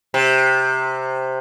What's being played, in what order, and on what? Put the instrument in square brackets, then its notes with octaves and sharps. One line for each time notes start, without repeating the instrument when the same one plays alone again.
[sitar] C3